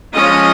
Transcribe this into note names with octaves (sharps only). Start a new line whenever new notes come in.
F3 G#3 C#4 F4 D#5